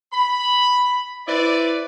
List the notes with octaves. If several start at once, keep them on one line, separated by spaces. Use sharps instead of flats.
B5
E4 B4 C5 D5